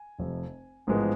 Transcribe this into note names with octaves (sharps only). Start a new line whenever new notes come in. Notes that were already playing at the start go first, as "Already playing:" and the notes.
Already playing: G#5
F1 F2 C3
A1 G#2 F3 G#3 B3